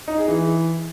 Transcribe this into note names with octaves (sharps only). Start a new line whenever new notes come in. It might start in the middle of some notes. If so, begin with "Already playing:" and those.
D#4
G#4
E3